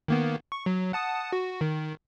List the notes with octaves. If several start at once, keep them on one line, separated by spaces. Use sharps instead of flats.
D#3 A#3 B3
C#6
F#3
F#5 A5 D#6
F#4
D#3